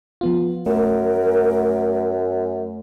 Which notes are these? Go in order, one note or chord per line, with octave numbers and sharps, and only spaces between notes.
F3 B3 F4
F#2 A3 A#4